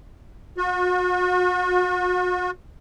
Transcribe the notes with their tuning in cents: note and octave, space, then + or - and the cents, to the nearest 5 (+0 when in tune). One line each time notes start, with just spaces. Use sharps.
F#4 -40